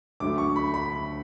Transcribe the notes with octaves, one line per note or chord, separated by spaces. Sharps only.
D2 D3 F#3 A3 D6
C#6
B5
B5